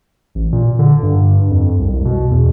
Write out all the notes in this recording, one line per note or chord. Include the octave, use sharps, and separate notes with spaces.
A1
A#2
D3
G2
F2
C2
C2
B2
E2